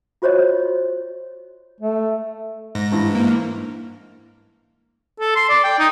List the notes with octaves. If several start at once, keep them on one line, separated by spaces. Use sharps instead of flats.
F4 F#4 C5 C#5 D#5
A3
G#2 A#6
G2 E3
A#3
A4
C6
D5
G5
D#4